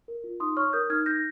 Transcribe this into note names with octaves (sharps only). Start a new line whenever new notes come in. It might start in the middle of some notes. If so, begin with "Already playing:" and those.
A#4
F4
D#4 C6 D#6
C#5 C#6 F6
A#4 D#6 G6
D#4 F6 G#6
D#4 G6 A#6